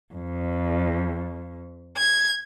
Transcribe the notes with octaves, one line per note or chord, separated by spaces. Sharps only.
F2
G#6